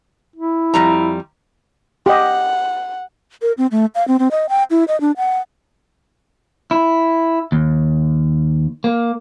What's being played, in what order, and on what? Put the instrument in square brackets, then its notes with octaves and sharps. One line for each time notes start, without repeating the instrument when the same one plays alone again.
[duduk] E4
[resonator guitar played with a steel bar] F2 G3 A#5
[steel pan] G4 D#5 [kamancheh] F#5
[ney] A#4
C4
A3
F5
C4
C4
D#5
G5
E4
D#5
D4
F#5
[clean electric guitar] E4
D#2
A#3